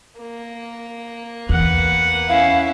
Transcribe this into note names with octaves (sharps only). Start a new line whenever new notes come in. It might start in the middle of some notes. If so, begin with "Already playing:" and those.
A#3
E2 B4 F#5
C#4 E4 F5